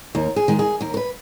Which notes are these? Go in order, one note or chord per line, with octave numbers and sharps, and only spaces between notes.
D#2 A#4
G#4
D#3 G#3
G#4
D#2 A#4
A#4
B4